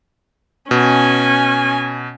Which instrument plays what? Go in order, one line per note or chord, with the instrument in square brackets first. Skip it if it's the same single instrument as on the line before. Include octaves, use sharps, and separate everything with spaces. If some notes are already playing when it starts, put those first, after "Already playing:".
[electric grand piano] B2 [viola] C#4 G#5